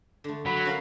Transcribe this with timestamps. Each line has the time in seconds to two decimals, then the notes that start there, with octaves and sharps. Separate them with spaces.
0.24 D3 A3
0.46 F#3 B5
0.66 C#4 A#4 F5